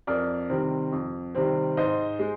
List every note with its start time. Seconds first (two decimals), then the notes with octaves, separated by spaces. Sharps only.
0.07 F2 A#4 D5
0.50 C3 D#3 G3 C4
0.92 F2
1.35 C3 D#3 G3 C4
1.77 G#2 C5 D#5
2.19 G#3